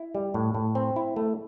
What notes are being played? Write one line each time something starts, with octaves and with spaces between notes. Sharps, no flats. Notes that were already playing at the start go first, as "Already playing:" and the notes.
Already playing: E4
G3
A2
A2
C4
E4
A3